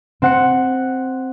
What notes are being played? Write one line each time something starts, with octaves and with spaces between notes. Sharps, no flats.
C4 F#5 C#7